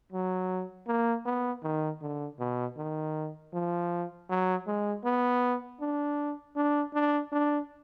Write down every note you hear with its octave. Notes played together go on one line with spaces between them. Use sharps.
F#3
A#3
B3
D#3
D3
B2
D#3
F3
F#3
G#3
B3
D4
D4
D4
D4